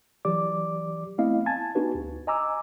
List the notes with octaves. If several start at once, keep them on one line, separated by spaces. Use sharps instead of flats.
E3 F#3 G4 D5 D6
A3 B3 C4 E4 D#5 F5
G#5 A5 G#6 A6
B3 D4 D#4 F#4 G4 B4
D2
D#5 G#5 A#5 D6 E6